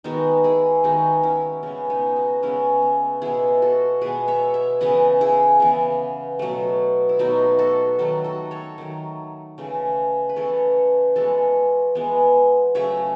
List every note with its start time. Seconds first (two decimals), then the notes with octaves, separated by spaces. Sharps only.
0.04 D#3 G#3 B3 D#4 F#4
0.44 E4 G#4
0.84 D#3 G#3 B3 D#4 F#4
1.23 C#4 E4
1.63 C#3 G#3 B3 C#4
1.90 B3 D#4
2.16 D#4 F#4
2.43 C#3 G#3 B3 C#4 E4
2.82 B3
3.22 B2 G#3 B3 E4 G#4
3.62 F#4 A4
4.01 B2 G#3 B3 G#4 B4
4.28 C#5 E5
4.54 C#5 E5
4.81 C#3 E3 B3 B4 D#5
5.21 E4 G#4
5.60 C#3 E3 B3
6.39 B2 F#3 A3
7.09 E4
7.19 B2 F#3 A3 D#4 F#4
7.59 F#4 A4
7.99 D#3 F#3 A3 F#4 A4
8.24 F#4 A4
8.51 A4 C#5
8.78 D#3 F#3 A3
9.58 C#3 E3 A3
10.29 B4
10.36 C#3 E3 A3 A4 C#5
11.16 E3 G#3 B3 F#4 A4
11.95 E3 G#3 B3
12.75 C#3 F#3 A3 C#5 E5